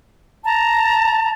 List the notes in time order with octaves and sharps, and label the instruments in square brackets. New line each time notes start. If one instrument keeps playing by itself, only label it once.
[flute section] A5 A#5